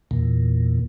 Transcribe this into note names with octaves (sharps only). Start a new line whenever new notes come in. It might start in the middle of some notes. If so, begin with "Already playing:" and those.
E2 A#2